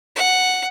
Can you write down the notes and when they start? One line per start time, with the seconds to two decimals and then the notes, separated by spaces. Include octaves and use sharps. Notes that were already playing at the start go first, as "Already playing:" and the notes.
0.16 F#5